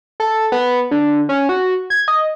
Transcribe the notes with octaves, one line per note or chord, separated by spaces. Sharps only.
A4
B3
D3
C#4
F#4
G#6
D#5